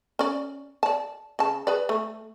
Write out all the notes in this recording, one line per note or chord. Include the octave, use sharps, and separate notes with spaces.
C#4 D5
D5 A5
C#3 A5
G#4 B4 D5
A3